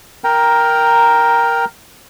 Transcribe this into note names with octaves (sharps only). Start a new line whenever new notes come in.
A#4 G5 A#5